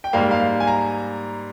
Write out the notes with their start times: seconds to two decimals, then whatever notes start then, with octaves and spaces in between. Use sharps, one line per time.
0.04 G5
0.13 G#2 G3 A#3 F5
0.31 F5
0.60 G#5
0.67 A#5